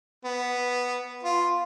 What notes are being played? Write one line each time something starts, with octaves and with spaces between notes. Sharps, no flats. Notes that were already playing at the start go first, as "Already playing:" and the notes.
B3
F4